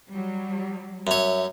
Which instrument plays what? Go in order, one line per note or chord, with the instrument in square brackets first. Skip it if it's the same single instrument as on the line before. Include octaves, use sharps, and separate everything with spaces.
[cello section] F#3 G3
[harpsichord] F#2 C#5 [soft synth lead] E5